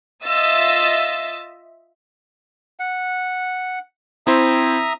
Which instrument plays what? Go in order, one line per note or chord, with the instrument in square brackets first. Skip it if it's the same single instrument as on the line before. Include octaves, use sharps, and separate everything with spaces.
[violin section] F4 D#5 E5 E6 A6
[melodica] F#5
[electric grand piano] C4 E4 C5 [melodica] E5 A#5 D#6